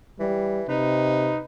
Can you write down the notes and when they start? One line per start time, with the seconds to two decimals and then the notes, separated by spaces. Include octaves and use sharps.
0.20 E3 G3
0.69 C3 D#4 B4